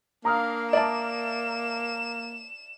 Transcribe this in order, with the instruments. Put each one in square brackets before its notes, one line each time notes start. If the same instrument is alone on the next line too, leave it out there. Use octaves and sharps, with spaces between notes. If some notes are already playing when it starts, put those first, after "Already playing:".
[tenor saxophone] A#3 [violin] D4 F5 [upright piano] A#5 D#6 F6
[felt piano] D5 E5 A5 [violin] E7